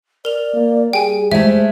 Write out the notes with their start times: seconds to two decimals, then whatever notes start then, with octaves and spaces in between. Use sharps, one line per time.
0.25 A#4 D5 F7
0.54 A#3
0.93 G3 G#4 G5 G#5
1.31 G#3 A3 C5 E5